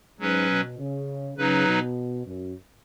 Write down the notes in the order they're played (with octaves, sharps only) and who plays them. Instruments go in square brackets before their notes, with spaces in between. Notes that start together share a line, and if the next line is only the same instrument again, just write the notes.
[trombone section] G#2 [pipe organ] F#3 C#4 B4
[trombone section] B2
C#3
[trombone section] C#3 [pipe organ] F#3 D#4 B4
[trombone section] B2
F#2